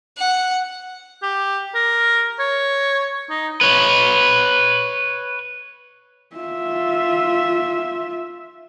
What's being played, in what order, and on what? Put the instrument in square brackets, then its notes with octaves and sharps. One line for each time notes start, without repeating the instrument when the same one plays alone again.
[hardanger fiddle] F#5
[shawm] G4
A#4
C#5
D#4
[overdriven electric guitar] B4 C#5
[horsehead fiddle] F4 E5